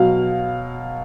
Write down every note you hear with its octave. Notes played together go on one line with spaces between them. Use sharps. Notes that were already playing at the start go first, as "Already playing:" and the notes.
Already playing: B2 F#3 F5